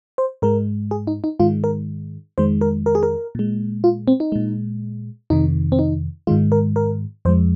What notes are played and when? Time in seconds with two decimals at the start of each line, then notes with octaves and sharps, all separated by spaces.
0.18 C5
0.42 G#2 G#3 A#4
0.91 G#4
1.07 D#4
1.24 D#4
1.40 G#2 D#3 G#3 F4
1.64 A#4
2.38 F2 D#3 G#3 C5
2.61 A#4
2.86 A#4
2.95 G#4
3.03 A#4
3.35 A#2 G#3
3.84 F4
4.08 C4
4.20 D#4
4.32 A#2 G#3
5.30 F2 C3 D#3 D#4
5.72 C4
5.79 D#4
6.27 G#2 D#3 G#3 F4
6.52 A#4
6.76 A#4
7.25 F2 F3 G#3 C5